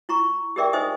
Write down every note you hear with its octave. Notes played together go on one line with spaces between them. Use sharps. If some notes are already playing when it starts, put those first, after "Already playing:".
E4 A#5 C#6
G4 G#4 A#4 D5 E5 G5
D#4 C5 D#5 E5 G#5 D#6